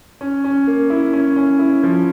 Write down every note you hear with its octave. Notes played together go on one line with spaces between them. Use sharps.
C#4
C#4
A#3
E4
C#4
C#4
E4
F3